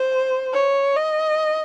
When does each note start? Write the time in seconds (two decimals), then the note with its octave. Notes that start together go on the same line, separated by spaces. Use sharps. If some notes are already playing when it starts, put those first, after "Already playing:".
Already playing: C5
0.53 C#5
0.96 D#5